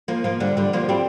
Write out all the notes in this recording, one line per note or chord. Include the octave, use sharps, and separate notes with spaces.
F3 A#3
F3 A#3
D3 G3
D3 G3
F3 A#3
G3 C4